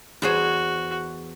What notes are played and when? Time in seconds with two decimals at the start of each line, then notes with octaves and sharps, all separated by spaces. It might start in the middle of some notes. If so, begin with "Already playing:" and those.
0.22 E2 F#4 G#4 C5